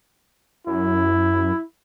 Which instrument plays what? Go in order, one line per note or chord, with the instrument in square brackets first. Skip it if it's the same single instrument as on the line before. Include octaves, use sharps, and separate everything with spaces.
[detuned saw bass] F#2 [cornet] E4